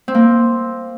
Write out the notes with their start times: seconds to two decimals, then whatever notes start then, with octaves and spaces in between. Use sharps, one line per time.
0.08 C4
0.15 A#3